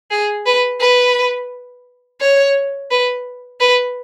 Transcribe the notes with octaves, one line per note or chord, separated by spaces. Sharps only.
G#4
B4
B4
C#5
B4
B4